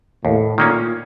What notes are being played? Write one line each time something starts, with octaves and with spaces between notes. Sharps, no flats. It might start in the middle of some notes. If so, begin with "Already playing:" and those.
D#2 A2
A#2 D#3 A#3 C#4